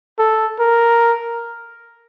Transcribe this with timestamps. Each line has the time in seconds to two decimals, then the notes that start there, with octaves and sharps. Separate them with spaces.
0.19 A4
0.59 A#4